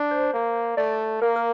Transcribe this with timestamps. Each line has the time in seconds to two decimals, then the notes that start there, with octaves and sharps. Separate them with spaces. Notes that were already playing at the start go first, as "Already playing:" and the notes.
Already playing: D4
0.11 C5
0.34 A#3
0.77 A3 D5
1.22 A#3 A#4
1.36 A#4